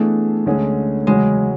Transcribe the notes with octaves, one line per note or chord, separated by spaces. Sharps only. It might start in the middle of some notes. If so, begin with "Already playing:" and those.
Already playing: E3 A3 B3 D4 G#4
D2 D3 G#3 C#4 G#4
E2 C#3 F#3 G#3 C#4